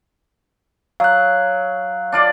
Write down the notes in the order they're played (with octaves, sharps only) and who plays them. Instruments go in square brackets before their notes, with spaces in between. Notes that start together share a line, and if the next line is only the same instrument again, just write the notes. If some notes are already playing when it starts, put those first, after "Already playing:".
[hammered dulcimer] F#3 [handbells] F5 F#6
[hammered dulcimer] D4 F4 D5